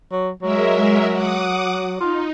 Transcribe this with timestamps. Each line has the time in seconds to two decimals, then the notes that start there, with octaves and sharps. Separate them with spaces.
0.11 F#3
0.42 F#3 G#3 A#4 E5
1.11 F#5 D6 D#6
2.00 D#4 F4